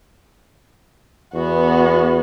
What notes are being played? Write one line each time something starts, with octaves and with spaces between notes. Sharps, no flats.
E2 B3 F#4